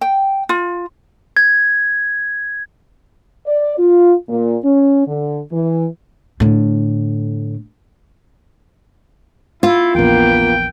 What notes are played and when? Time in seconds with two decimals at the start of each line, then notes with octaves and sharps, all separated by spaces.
0.01 G5
0.49 F4
1.37 G#6
3.47 D5
3.78 F4
4.28 A#2
4.64 C#4
5.06 D3
5.52 E3
6.40 A2 D3
9.63 E4 F4
9.95 A#1 E2 A#3 B3 G5